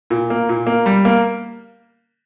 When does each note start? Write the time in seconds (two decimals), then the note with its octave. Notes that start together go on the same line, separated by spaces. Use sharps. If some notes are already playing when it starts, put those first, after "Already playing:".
0.10 A#2
0.30 A#3
0.49 A#2
0.67 A#3
0.86 G3
1.05 A#3